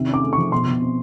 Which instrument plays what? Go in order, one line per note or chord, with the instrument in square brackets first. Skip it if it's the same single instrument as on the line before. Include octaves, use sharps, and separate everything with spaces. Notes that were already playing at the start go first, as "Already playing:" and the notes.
Already playing: [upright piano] C3 D#3
C#4
D6
A3
C#6
F3
B2 C6
B2
C4